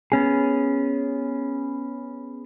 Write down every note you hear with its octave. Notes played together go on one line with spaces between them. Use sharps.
B3 C#4 G#4